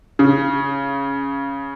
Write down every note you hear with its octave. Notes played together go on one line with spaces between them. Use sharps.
C#3